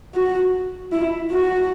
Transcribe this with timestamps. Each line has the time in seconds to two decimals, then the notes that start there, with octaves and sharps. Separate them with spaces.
0.15 F#4
0.92 E4
1.31 F#4